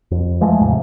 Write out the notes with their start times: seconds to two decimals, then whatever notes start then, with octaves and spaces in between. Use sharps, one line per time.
0.11 F2
0.41 E3 F3 G#3 A3
0.61 D#2 G#2 C3